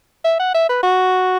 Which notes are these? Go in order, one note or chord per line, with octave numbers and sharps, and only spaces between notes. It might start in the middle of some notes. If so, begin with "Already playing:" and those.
E5
F#5
E5
B4
F#4